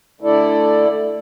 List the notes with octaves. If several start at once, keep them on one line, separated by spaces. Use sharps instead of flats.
D3 A3 E4 A4 D5